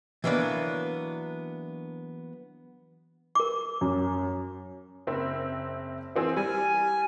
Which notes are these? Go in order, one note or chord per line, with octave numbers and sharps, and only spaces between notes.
E3 F#3 A#3 B3 D4
A#4 D6
F#2
F#1 C4 E5
E3 C4 G#4
G3 G#5